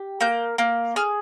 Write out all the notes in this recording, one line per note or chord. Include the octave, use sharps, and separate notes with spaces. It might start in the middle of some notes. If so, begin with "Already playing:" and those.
Already playing: G4
A#3 G6
A#3
G#4 F6